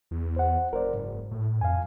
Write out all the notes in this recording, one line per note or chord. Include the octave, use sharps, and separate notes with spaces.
E2
C5 F#5
F#1 A#4 C5 D5
G#2
A2
F2 F5 G#5